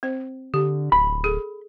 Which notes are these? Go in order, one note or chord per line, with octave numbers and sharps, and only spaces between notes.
C4 C5
D3 G4
D1 B5
G#4 A4